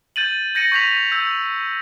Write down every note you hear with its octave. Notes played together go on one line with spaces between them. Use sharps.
G6 A6 D#7 F#7
G6 A#6 C#7 D#7
C#6 G6 B6 F7
E6 G6